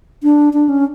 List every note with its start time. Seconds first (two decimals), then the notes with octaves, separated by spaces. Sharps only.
0.23 D4
0.53 D4
0.69 C#4